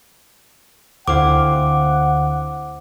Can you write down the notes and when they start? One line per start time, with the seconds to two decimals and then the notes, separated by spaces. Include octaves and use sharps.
1.08 D2 D3 C4 E4 F5 F#5 D6